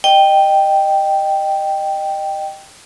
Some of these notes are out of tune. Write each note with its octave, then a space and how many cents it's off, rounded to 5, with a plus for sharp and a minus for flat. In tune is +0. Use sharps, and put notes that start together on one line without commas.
D#5 -20 G5 +0